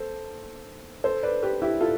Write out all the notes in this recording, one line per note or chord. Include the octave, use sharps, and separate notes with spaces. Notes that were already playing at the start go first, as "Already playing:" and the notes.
Already playing: A4 C5
A4 C5
B4 D5
G4 B4
E4 G4
F4 A4